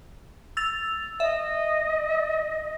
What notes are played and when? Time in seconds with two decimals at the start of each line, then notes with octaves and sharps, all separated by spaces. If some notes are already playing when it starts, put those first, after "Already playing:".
0.57 E6 A6 F7
1.20 D#5 E5